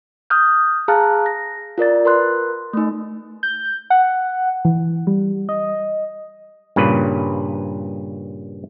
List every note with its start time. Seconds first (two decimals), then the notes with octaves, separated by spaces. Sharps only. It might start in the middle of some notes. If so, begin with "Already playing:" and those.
0.30 D#6 F6 G6
0.88 G#4 F5 A5 A#5 F6 F#6
1.26 A#6
1.78 F4 A#4 D5 A6
2.05 A#4 B4 C6 F#6
2.73 A3 D#4
3.43 G6
3.90 F#5
4.65 E3
5.07 G3
5.49 D#5
6.76 G2 A#2 C#3 B4